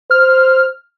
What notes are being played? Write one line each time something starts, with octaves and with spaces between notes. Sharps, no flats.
C5 F6